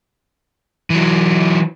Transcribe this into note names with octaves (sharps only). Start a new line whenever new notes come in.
E3 F#3